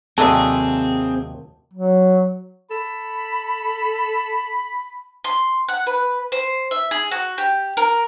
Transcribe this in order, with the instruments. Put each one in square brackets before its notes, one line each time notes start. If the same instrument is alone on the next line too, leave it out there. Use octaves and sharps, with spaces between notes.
[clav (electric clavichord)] D#2 C3 F#3 [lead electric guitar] C4 G#4 [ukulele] A4 D5 [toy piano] A5
[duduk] F#3
[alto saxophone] A4 [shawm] B5
[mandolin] C6
F#5
B4
C5
E5
G#4
F#4
G4
A#4